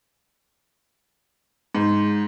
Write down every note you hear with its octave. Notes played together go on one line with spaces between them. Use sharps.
G#2